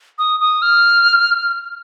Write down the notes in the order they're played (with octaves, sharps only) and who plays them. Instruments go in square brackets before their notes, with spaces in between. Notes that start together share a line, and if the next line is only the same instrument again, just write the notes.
[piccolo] D#6
D#6
F6